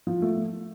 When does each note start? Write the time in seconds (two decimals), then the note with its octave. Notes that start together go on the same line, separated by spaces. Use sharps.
0.07 F3
0.22 A3